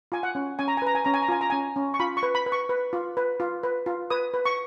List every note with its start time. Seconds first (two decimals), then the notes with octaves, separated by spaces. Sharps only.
0.12 F4 G#5
0.23 F#5
0.35 C#4
0.59 C#4 G#5
0.68 A#5
0.77 G#5
0.82 B4 A#5
0.95 G#5
1.05 C#4 A#5
1.14 G#5
1.22 A#5
1.29 F4 G#5
1.41 A#5
1.50 C#4 G#5
1.76 C#4
1.94 C#6
2.00 F4 B5
2.17 C#6
2.23 B4
2.35 B5
2.46 B4
2.52 C#6
2.69 B4
2.93 F4
3.17 B4
3.40 F4
3.63 B4
3.86 F4
4.10 B4 D#6
4.34 B4
4.45 C#6